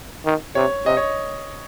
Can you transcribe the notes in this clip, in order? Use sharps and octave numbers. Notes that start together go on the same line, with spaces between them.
D#3
C3 C#5
C3 D#5
C#5